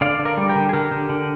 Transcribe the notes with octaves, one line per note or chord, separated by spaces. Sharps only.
D3 D5 F5
D3
A#4 D5
G3
G4 A#4
D3
G#4
D3 G4 A#4
D3
D3